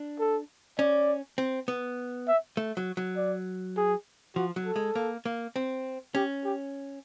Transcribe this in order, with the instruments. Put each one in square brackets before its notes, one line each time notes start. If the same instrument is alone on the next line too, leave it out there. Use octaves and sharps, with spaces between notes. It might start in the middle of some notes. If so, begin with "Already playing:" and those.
Already playing: [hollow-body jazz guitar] D4
[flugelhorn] A4
[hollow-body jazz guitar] C#4 [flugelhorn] D5
[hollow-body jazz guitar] C4
B3
[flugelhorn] E5
[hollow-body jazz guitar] A3
F#3
F#3
[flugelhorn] D5
G#4
[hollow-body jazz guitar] F3 [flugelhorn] F#4
[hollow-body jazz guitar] F#3
[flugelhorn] A4
[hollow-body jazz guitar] G#3
A#3
A#3
C4
[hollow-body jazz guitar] C#4 [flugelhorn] G4
[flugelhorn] G4